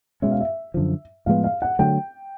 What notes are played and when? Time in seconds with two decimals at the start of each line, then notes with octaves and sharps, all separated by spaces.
0.22 B2 G#3 C#4 E5
0.32 F5
0.41 E5
0.74 F#2 D3 F3
1.26 A2 F3 G#3 B3 F5
1.44 F5
1.62 F#5
1.79 D3 F#3 A3 G5